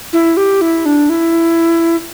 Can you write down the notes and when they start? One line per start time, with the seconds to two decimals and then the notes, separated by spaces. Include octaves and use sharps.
0.13 E4
0.37 G4
0.61 E4
0.86 D4
1.10 E4